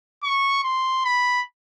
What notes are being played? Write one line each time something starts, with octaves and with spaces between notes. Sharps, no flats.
C#6
C6
B5